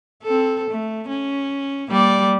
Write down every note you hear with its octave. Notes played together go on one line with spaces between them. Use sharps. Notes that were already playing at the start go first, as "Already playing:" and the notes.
C4 A4
A3
C#4
G3 A#3 D5